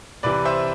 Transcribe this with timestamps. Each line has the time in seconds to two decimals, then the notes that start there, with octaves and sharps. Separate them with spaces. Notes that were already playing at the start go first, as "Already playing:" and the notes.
0.23 C2 C3 E3 B4 D5
0.45 C5 E5